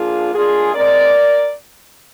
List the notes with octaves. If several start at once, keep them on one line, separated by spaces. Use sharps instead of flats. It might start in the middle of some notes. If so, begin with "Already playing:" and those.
Already playing: F3 A#3 D4 F4 G#4
A#2 G#3 D4 F4 G#4
G#3 C4 A#4 D5